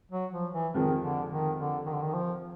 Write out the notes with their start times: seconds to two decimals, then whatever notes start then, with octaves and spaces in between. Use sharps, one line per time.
0.12 F#3
0.33 F3
0.53 E3
0.74 F2 C3 D#3 F3 G#3
1.02 D3
1.31 D#3
1.58 D3
1.86 D#3
1.94 D3
2.02 D#3
2.13 F3